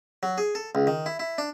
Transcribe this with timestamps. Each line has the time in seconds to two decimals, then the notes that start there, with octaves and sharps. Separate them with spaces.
0.23 F#3
0.38 G#4
0.55 A4
0.75 C#2
0.87 D#3
1.06 E4
1.19 E4
1.38 D4